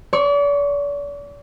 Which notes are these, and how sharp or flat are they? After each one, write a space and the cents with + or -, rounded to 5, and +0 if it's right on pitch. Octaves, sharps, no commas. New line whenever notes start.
D5 -40 C#6 -15